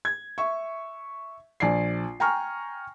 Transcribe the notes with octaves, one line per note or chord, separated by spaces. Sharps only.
G#6
E5 C#6
A#1 D5 G#5 C7
G5 G#5 A#5 C#6 F6